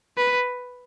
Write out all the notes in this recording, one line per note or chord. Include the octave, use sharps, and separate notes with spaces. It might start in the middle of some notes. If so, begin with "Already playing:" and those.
B4